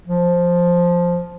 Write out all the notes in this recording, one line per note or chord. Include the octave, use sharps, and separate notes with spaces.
F3